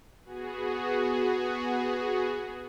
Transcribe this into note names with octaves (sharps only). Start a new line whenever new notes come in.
B3 F#4 G#4